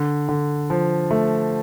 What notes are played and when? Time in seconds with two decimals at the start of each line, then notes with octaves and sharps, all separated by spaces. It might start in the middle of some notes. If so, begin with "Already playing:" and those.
Already playing: D3
0.29 D3
0.70 F3
1.11 A3